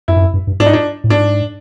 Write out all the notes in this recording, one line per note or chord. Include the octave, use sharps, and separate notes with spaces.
F#2 E4
G2
F#2
G2
G2
G#2 D4
D#4
D4
A2
G#2 D4